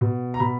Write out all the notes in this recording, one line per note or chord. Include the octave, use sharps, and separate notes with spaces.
B2
A#5
B2 B5